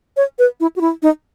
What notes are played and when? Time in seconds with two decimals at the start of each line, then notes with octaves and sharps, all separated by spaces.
0.17 C#5
0.39 B4
0.60 E4
0.76 F#4
0.81 E4
1.02 D#4